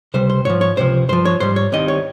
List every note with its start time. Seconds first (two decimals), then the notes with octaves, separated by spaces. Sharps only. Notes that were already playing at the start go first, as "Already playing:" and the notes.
0.14 C#2 C3 G3 C5
0.30 C5
0.45 G#2 F3 C#5
0.61 C#5
0.77 C#2 C3 F3 C5
1.09 G2 F3 C5
1.25 C#5
1.40 G#2 G3 C5
1.56 C#5
1.72 C2 C3 D#3 G3 D#5
1.88 C#5